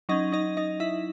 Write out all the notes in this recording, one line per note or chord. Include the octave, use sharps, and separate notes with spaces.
F#3 C#4 D#4 D#5
D#4 D#5
D#4 D#5
E4 E5